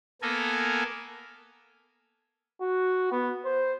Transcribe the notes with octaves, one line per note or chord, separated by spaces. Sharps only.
A#3 B3 A4 A#4 G#5
F#4
B3
C5